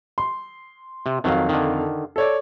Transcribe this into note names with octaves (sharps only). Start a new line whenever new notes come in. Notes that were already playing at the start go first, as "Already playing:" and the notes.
C6
C3
F2 D#3 F#3 F5
D3 D#3
A4 C#5 D5